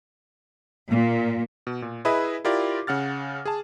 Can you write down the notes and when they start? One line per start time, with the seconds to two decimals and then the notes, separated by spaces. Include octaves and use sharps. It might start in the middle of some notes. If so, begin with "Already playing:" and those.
0.89 A#2
1.67 B2
1.82 A#2
2.05 E4 G#4 B4 D#5 E5
2.45 E4 F4 G4 A#4 D5 D6
2.87 C#3 F#5 F6 A6
3.45 G#4 A5